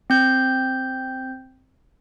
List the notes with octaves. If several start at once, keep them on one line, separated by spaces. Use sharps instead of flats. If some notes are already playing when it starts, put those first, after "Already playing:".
C4 G6